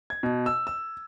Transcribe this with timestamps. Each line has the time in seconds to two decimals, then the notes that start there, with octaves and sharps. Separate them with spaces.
0.10 G#6
0.23 B2
0.46 E6
0.67 E6